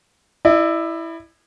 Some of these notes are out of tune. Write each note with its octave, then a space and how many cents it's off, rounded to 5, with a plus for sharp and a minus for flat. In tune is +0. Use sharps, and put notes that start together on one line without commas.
E4 +0 D5 +45